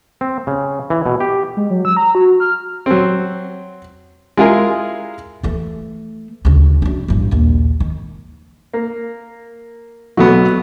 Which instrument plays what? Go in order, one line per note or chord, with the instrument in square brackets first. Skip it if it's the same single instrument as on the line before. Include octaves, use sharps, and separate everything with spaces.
[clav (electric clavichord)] C4
C#3
E3
B2
G4
[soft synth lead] G#3
F#3
E6
A#5
F#4
F6
[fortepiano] F#3 C4
G#3 E4 F4 G#4 A#4 G#5
[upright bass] E3 A3
D2 C#3
F#2 D4
A1 G2
A#1 D#2
D#3
[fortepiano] A#3
[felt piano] B1 F#4 [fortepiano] F#3 A3 B3